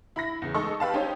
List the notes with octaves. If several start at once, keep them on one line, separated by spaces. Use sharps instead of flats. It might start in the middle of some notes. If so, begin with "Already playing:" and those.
E4 B5 A#6
E2 C#3
G#3 D#4 A4 D#5 C#6 E6
G4 B4 F5 A5
C#4 D#4 G4 C5 C#5